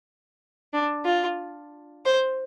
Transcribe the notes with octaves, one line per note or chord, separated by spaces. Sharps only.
D4
F4
C5